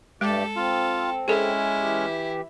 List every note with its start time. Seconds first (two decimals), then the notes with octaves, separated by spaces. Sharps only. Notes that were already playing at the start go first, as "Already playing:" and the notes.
0.21 G2 G#3 A3 G4 A4 D5
0.56 C4 F4
1.28 G#3 C#4 E4 G#4 A4
1.80 E3 G4